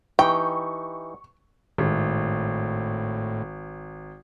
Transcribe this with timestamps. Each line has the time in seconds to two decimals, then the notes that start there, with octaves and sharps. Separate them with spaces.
0.19 E3 D#4 G4 G5 C#6
1.78 G#1 A2